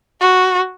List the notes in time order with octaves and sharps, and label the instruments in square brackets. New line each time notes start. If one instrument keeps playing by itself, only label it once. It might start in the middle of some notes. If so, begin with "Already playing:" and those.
[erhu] F#4